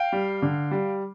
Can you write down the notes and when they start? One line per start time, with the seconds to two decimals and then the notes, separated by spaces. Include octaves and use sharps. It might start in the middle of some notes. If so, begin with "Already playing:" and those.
Already playing: F5 G5
0.13 G3
0.42 D3
0.71 G3